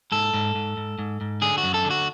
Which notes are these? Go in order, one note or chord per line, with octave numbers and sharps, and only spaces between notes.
G#2 A4
G#2
G#2
G#2
G#2
G#2
D3 G#4
F#4
F#2
A4
D3
F#4